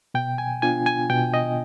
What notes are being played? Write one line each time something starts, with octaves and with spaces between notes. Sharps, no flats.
B2 G5
G#5
B3 D4 F4 G#5
G#5
B2 G5
D#5